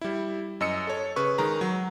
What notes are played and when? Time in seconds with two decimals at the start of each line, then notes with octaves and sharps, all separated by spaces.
0.01 G3 E4
0.60 F#2 D#5 E6 C#7
0.87 A4 C#5
1.16 C#3 B4 C#6
1.38 D#3 G#3 A#5
1.61 F#3